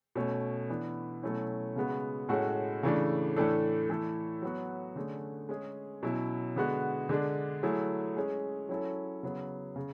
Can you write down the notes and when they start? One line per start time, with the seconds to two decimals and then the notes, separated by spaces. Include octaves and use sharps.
0.15 B2 A3 C#4
0.70 E3 B3 D4
1.23 B2 F#3 A3 C#4 E4
1.76 C#3 G#3 B3 F#4
2.29 A2 G#3 C#4 F#4 A4
2.83 C#3 E3 A3 D4
3.36 A2 E3 A3 D4 A4
3.89 E3 A3 E4 A4
4.42 F#3 B3 F#4
4.96 D3 A3 C#4 G#4
5.49 G#3 C#4 G#4
6.03 B2 F#3 C#4 E4
6.56 D3 G#3 B3 F#4
7.09 D3 G#3 D4
7.63 F#3 A3 E4 G#4
8.16 G#3 C#4 G#4
8.69 F#3 C#4 E4 A4
9.23 C#3 F#3 B3
9.76 C#3